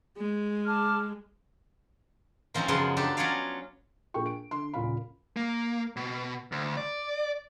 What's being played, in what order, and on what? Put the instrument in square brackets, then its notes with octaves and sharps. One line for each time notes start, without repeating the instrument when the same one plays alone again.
[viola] G#3
[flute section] A5 D6 F6
[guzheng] D#3 F3 C4 C#4 D#4
F#2 C#3 F3 B3 F4 C6
D4 D#4 G4 A4
F#3 C#4 F4 C#5 D5 F5
[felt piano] A#1 F4 G#4 A#4 G5 C#6
D7
D3 C6
D#1 A#2 C#3 F4 F5 B5
[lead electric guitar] A#3
B2
D2
D5